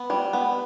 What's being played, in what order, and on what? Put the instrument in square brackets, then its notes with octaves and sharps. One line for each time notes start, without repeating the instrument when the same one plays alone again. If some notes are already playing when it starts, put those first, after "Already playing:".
Already playing: [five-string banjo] B3
G3
B3